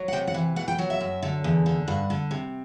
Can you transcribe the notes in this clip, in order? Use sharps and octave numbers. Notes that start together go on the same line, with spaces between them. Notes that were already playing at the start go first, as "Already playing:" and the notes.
Already playing: F#3
F#5
C3 G5
F#5
E3
B2 F#5
G5
F#3 F#5
E5
F#2
D3
E2
D3
G2 F#5
D3
C3